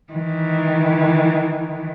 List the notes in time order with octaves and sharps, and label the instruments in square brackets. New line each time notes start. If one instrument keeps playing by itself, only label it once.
[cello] D#3 E3